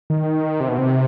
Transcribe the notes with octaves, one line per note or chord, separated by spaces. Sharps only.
D#3
C3
B2
C3